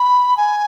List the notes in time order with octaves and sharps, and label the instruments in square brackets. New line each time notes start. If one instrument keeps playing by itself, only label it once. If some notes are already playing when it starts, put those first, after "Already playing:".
Already playing: [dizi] B5
G#5